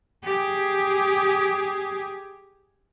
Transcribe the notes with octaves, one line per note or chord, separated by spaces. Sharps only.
G4 G#4